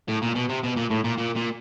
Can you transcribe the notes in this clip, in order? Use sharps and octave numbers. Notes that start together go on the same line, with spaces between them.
A2
A#2
B2
C3
B2
A#2
A2
A#2
A#2
A#2